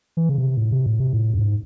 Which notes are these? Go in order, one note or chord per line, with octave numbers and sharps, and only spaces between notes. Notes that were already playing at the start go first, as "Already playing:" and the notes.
E3
C#3
C3
A2
C3
A2
C3
A2
F#2
G#2